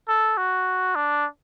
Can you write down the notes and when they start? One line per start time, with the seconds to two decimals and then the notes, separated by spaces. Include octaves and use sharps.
0.08 A4
0.37 F#4
0.96 D4